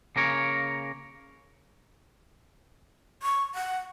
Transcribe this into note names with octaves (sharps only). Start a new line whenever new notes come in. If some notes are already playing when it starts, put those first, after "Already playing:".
C#3 A#3 A#4 C#5
C#6
F#5